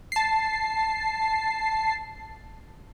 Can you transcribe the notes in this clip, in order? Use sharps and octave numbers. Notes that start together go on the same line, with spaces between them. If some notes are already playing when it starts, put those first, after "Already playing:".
A5 C7